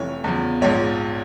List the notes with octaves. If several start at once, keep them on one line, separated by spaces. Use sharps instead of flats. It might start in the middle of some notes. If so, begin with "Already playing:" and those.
Already playing: F1 F2 E3 C#5
E2 C#3 F3
A#1 G#2 F3 C#5